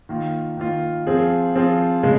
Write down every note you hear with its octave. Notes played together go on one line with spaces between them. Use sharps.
D#3 A#3 F4
D#3 A#3 F4
F3 C4 F4 G#4
F3 C4 F4 G#4
C#3 G#3